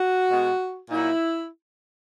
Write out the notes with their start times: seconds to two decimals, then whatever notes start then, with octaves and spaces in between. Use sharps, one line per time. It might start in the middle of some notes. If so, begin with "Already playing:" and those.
Already playing: F#4
0.30 B2 G#3 B3
0.90 A#2 F#3 A#3 D#4 E4